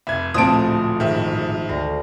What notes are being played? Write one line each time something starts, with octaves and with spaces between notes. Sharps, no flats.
F1 E5 G#6
D1 A#1 F3 A3 C4 A5 D#6 D7
G#1 D#3 E5
D2 A#6 C7